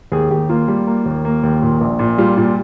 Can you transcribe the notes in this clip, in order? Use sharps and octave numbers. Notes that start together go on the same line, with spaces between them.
D#2 G#4
D#2 G4
A#3 F4
G3
A#3
D#2
A#3
D#2
A#2
A#1
A#2
G3 F4
A#2 F4